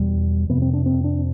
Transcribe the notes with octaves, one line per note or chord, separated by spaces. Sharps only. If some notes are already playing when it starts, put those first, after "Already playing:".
Already playing: E2 B2 G3
F2 C3 B3
C4
D4
C4
D4